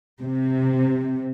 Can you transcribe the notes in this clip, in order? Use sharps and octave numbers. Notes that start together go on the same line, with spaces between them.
C3